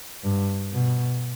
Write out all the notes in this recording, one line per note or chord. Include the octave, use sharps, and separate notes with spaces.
G2
B2